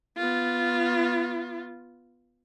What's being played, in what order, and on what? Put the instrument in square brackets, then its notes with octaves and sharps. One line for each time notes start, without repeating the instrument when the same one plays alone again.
[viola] B3 F4